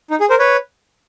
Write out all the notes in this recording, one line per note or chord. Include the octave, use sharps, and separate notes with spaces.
D#4
G#4
A#4 C5
B4 C#5